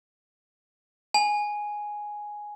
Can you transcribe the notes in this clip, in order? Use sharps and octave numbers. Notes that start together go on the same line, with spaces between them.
G#5